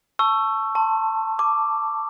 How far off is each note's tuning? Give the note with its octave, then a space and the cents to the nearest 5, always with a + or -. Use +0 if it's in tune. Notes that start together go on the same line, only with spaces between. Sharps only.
A5 +0 C#6 +0 E6 +20
A5 +15 C6 +25
A5 +0 D6 +0